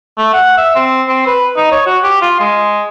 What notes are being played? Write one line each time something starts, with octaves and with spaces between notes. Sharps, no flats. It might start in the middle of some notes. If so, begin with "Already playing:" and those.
A3
F#5
E5
C4
C4
B4
D#4
C#5
F#4
G4
F4
G#3